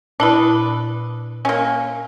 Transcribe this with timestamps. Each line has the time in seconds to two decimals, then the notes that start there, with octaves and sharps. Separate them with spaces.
0.20 A#2 D4 E4 B4 D#6
1.45 A#3 C#4